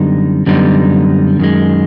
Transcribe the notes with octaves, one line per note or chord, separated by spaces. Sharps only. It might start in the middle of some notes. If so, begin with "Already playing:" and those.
Already playing: F#2 D3 G3 B3 D#4
F#2 D3 G3 B3 D#4
F#2 D#3 G#3